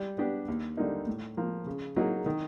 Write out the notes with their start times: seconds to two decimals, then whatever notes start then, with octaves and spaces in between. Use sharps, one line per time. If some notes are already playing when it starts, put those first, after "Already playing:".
Already playing: G3
0.18 B3 D4 G4
0.48 D#2
0.77 D3 G3 A#3 D#4
1.07 A2
1.37 F3 A#3
1.66 C#3
1.96 F#3 A#3 D#4 G#4
2.26 D#3